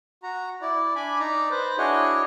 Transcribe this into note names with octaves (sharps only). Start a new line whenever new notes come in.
F#4 A#5
E4 D5
D4 G#5 B5 D6
D#4 D5 A#5
B4 C5
D4 E4 F#4 G#4 C#5 D#5